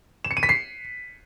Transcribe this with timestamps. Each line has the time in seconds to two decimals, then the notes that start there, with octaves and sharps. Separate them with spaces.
0.24 E7
0.31 C#7
0.37 D#7
0.43 B6
0.49 C7